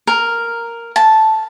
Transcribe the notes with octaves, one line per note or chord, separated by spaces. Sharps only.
A#4
A5